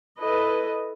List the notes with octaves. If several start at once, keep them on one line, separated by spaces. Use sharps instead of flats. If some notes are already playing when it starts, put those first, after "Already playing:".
E4 A4 B4 D#5